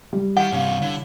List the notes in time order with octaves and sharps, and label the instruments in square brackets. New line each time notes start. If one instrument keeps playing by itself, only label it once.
[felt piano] G3
[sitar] D#3 E4 [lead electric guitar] G4 [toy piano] F#5
[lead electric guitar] G2 C3 [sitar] C#4 F4
[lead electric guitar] D3 [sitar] E4